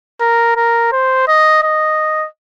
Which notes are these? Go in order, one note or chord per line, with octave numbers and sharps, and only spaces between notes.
A#4
A#4
C5
D#5
D#5